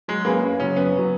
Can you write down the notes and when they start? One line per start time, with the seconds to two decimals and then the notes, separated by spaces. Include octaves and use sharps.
0.08 F#3 G#3
0.25 A#3 C#4 G#4 B4
0.43 F#2
0.60 C#3 F#3 C#4
0.76 F#2 B3
0.94 C#3 F#3